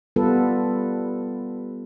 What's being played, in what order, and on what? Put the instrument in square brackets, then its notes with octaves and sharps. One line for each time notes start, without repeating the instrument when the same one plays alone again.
[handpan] G3 B3 F4 A4 B4